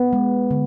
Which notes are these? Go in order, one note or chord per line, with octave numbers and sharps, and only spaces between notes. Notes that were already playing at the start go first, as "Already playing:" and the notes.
Already playing: B3
G#3
D3